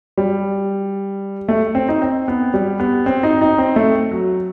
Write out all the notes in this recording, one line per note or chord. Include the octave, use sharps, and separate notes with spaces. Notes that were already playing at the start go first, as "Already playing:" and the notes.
G3
A3
C4
D#4
C4
B3
G3
B3
C4
D#4
D#4
C4
A3
F#3